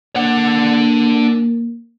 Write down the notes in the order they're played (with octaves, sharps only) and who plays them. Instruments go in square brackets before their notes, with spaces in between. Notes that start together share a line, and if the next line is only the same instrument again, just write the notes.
[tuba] A#3 [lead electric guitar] D4 F#5